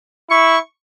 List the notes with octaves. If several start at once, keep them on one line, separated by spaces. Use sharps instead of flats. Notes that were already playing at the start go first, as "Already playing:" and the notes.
E4 C#6